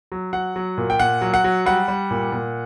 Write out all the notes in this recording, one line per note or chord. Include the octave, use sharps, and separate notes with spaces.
F#3
F#3 F#5
F#3
A#2
G5
A#2 F#5
F#3
F#5
F#3
G3 F#5
G3
A#2
A#2